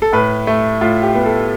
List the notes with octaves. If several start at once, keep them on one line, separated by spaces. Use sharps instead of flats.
A4
A2 B4
A3
A2 F4
G4
B3
A4